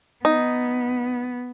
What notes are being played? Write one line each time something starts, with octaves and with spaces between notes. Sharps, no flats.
B3 D#4